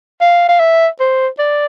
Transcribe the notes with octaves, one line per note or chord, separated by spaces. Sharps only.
F5
F5
E5
C5
D5